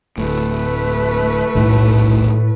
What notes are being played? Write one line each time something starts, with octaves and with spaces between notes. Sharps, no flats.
D1 A2 A3 B4
D#1 B1 A2 D#3